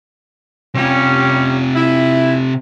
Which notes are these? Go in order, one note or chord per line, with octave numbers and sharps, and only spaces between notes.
C3 G3 C#4 F4
E4